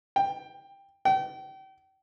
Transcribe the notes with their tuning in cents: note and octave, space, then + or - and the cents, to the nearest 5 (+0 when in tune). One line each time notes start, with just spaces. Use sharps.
G5 +10
G5 -35